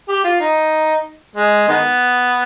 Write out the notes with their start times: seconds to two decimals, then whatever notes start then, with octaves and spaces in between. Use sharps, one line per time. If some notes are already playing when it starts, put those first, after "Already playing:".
0.09 G4
0.24 F4
0.40 D#4
1.36 G#3
1.69 D#3 G#3 B3